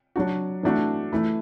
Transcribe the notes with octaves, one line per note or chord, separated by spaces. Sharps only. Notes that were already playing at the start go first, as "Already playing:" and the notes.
F#3 D4 F#4
E3 A3 D4 F#4
E3 A3 E4